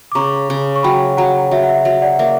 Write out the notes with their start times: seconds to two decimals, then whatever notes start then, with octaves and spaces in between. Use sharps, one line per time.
0.12 D6
0.15 C#3 A#5 C#6
0.50 C#3
0.76 C#6
0.83 F#3 G5 B5
1.17 F#3 F#5 A#5
1.51 F#3 E5
1.63 F#5
1.69 E5
1.85 F#3 E5
2.02 D5 F#5
2.19 A#3 E5